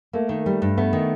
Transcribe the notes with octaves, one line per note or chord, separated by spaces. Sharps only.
A3 A#3
D#3
G3
G2
A3 B3
D#3